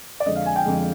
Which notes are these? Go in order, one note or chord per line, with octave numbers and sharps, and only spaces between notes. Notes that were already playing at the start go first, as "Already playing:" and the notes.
D5
F2 D3 G#3 D#5
F5
G#5
G5
F2 D3 G#3